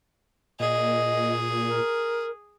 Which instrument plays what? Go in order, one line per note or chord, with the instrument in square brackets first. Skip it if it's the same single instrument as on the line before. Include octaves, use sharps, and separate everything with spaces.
[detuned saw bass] A#2 [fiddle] G#4 [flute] D#5
[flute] A#4